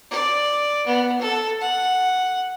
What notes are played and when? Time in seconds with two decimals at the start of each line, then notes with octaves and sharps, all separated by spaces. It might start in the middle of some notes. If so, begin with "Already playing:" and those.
0.11 D5
0.86 B3
1.21 A4
1.61 F#5